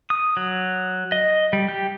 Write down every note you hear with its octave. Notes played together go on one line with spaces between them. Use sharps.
D#6
F#3
D#5
G3
G4